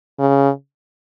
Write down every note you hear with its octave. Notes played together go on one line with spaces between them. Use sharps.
C#3